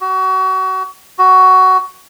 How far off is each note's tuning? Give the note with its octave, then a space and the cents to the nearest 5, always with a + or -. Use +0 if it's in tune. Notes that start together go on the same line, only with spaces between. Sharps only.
F#4 +30
F#4 +15